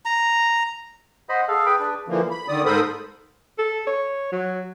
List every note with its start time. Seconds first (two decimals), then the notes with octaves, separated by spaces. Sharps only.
0.05 A#5
1.29 C5 D#5 F#5 B5
1.48 G#4 A4 F5
1.66 B4 G5 B5
1.80 D4 B4
2.08 D3 E3 F3 A#3
2.30 B5
2.48 D3 D#3 D5 D#6
2.65 G#2 A4 A#4 C5 B5 D#6
3.58 A4
3.87 C#5
4.32 F#3